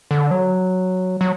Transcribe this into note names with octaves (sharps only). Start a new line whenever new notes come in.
D3
F#3
F#3